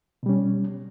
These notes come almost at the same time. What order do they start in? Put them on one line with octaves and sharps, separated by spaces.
B2 G3 C#4